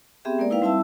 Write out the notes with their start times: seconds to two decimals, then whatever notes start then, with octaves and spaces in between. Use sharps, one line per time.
0.25 B3 C4 G4 G#4 E5 G5
0.38 G#3 A#3 A#4 D5
0.50 D#4 E4 B4 F5 G5
0.62 G3 C4 E4 E5 A5 E6